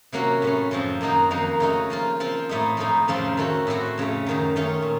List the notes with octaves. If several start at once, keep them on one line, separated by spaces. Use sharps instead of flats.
C3 F#3 A#3 C#4 F#4
A2 A3 C#4
F#2 C#3 F3 C4
F#2 D#3 A#3 D#4 F#4
F2 D#3 A#3 D#4 F#4
C#3 A3 D#4 F#4
F3 A#3 F4
F3 C4 F4
A2 A3 D#4
A2 F3 A3 D#4
F2 C#3 F3 C4 F4
D#3 A3 C#4 F#4
A2 A3 C4 F#4
F2 C#3 A3
F#2 D#3 F#3
D#3 A3 C#4 F4
A#2